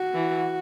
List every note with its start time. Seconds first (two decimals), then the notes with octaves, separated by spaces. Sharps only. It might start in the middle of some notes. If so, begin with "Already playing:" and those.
Already playing: F#4
0.14 E3